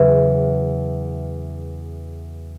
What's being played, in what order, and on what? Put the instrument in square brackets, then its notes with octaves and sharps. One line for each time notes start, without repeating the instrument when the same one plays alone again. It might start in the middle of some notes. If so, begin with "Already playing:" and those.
Already playing: [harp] E2 C#3 F#3 [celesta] B4 E5